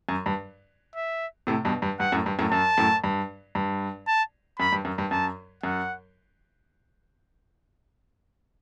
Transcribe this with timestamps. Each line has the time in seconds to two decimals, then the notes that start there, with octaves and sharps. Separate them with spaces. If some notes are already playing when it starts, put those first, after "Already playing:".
0.09 F#2
0.26 G2
0.96 E5
1.47 A2 C3
1.65 G2 B2
1.82 G2
2.00 G2 F#5
2.12 F#2 A2
2.26 G2
2.39 F#2 A2
2.51 F#2 A5
2.78 F#2 A2
3.04 G2
3.55 G2
4.07 A5
4.59 F#2 B5
4.72 G2
4.85 F#2
4.98 G2
5.11 F#2 A5
5.63 F#2 F#5